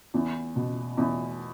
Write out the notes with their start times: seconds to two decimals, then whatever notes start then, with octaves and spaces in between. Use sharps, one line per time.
0.14 E2
0.56 B2
0.97 E2